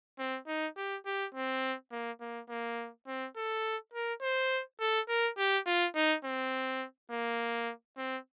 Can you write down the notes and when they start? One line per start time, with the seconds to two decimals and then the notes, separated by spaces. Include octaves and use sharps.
0.19 C4
0.47 D#4
0.77 G4
1.06 G4
1.35 C4
1.92 A#3
2.21 A#3
2.49 A#3
3.07 C4
3.36 A4
3.94 A#4
4.22 C5
4.80 A4
5.09 A#4
5.38 G4
5.66 F4
5.95 D#4
6.25 C4
7.11 A#3
7.97 C4